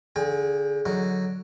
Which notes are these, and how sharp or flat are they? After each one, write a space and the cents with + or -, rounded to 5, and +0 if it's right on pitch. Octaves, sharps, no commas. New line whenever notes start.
D3 -25 G#4 +0 G5 +30
D3 +0 F#3 +0 D#4 +0